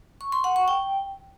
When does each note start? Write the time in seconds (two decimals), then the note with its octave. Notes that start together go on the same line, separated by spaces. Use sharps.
0.21 C#6
0.32 C6
0.44 F#5
0.56 C#6
0.68 G5